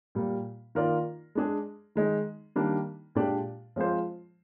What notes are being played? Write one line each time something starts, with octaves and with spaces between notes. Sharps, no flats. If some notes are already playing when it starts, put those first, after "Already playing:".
A#2 G3 A#3
D#3 A#3 F4 A#4 D5
G#3 D4 G#4
D#3 G#3 D#4
D#3 G3 A#3 D4
A#2 G#3 D4 G4 D5
F3 G#3 C4 F4 C5